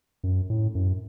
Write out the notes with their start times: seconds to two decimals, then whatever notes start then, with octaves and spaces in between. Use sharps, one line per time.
0.24 F#2
0.50 A2
0.75 F#2